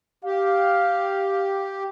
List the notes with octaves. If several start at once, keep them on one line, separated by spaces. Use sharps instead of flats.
G4 F5